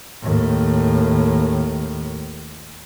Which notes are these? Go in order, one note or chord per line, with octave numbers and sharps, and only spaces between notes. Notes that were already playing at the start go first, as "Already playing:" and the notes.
D#2 A2